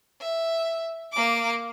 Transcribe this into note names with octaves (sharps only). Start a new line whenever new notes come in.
E5
A#3 D6